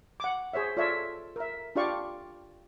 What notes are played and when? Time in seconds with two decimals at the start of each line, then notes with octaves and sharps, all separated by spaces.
0.20 F#5 D6
0.53 G#4 C5 C#5 E5
0.77 F4 A4 C#5 D5 E5
1.36 A#4 E5
1.76 D4 F4 G4 D5 F5 C#6